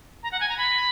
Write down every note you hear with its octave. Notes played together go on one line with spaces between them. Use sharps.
A#5
F#5
G#5
A#5
B5